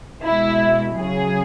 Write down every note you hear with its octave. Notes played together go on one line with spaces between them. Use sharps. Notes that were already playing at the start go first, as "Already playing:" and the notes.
B2 G#3 E4
C#3 F#3 G#4